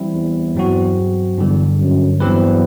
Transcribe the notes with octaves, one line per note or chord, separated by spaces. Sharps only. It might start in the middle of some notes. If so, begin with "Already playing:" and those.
Already playing: E3 G3 C4 E4
E2
G2 F#3 C4 F#4
E2 G2 D3 G3
F#2
E2 G2 F#3 C4 G4 B4